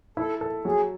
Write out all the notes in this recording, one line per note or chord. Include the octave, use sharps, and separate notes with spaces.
E4 A4
A4
F#3 G#4